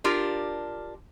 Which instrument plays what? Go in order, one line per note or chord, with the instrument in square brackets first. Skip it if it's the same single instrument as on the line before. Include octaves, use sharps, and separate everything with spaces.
[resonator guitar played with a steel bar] D4 F4 G4 A#4